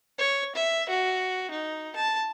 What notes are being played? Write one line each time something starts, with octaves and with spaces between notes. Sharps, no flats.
C#5
E5
F#4
D#4
A5